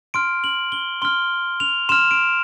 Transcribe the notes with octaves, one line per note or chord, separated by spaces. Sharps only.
C6 F6 D7
F#7
G7
C6 F6 G7
F7
C6 F6 E7
D7